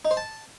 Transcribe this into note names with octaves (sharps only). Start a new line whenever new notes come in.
D#4
C5
A5